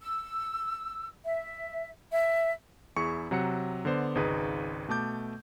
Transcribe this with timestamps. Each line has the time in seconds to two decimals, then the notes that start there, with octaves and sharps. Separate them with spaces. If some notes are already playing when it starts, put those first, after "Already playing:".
0.01 E6
1.24 E5
2.11 E5
2.96 E2 E4 G#4 C#6 C#7
3.31 C3 F#3 F#5 A#5 C#7
3.85 D3 B3 C5 D5
4.15 G#1 C#2 D#4 G#4 B4
4.88 B2 A3 A5 D6 G6